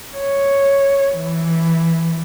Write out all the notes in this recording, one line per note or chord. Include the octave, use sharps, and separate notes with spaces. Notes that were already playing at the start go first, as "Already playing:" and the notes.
C#5
E3